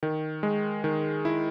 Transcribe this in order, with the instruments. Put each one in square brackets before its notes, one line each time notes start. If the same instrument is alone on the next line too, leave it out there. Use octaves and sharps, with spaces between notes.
[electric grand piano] D#3
G#3
D#3
E4